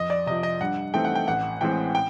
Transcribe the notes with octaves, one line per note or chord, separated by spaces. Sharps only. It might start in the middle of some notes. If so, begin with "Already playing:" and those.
Already playing: F2 D#5
D5
C3 F3 D#5
D#5
G2 F#5
E3 A3 C4 D#4 G5
F#5
G5
A1 F#5
A2 E3 G#3 C4 G5
G5